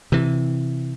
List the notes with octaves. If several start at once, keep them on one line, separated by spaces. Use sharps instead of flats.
C3 E3